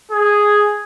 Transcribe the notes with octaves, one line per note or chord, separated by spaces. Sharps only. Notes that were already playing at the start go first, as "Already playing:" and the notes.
G#4